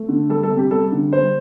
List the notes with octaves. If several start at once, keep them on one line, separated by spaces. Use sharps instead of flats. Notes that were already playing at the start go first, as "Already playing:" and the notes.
Already playing: A3
D3
G3 A4
A4
C3
G4
G3 A4
D3
G3 C5